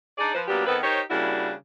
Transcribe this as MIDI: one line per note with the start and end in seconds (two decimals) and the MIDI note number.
0.18 0.33 62
0.18 0.33 63
0.18 0.33 68
0.18 0.33 74
0.35 0.43 53
0.35 0.43 71
0.35 0.43 72
0.48 0.63 54
0.48 0.63 58
0.48 0.63 59
0.48 0.63 62
0.48 0.63 67
0.66 0.78 51
0.66 0.78 59
0.66 0.78 60
0.66 0.78 69
0.66 0.78 71
0.83 1.01 63
0.83 1.01 67
0.83 1.01 70
0.83 1.01 72
0.83 1.01 73
1.11 1.53 49
1.11 1.53 55
1.11 1.53 58
1.11 1.53 62
1.11 1.53 64
1.11 1.53 66